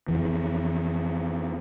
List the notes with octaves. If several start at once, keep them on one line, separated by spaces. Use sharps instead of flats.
F2 E3